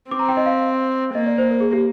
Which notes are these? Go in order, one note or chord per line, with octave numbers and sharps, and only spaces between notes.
C4 D6
A#5
G5
D#5
F5
A#3 D#5
D5
C5
A#4
G#4
G4